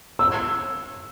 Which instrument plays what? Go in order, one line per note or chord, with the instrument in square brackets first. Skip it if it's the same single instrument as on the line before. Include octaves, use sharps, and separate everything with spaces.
[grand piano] E6